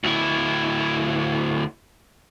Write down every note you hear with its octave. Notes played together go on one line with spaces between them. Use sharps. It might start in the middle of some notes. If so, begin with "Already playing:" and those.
D2 E4